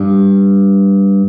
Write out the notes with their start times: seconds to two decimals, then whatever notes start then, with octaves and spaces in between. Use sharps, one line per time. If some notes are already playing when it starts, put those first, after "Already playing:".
Already playing: G2